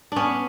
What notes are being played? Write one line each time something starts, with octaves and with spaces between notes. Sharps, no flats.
B3 C#4 D4